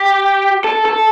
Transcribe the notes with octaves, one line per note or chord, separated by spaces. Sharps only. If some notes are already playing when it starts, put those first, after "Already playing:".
Already playing: G4
A4
A4